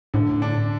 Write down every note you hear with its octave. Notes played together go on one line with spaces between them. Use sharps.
A2 D3
D4